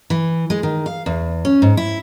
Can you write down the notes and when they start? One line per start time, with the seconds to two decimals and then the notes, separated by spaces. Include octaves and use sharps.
0.10 E3
0.50 G#3
0.63 D#3
0.86 F5
1.06 E2
1.45 C#4
1.62 G#2
1.77 E4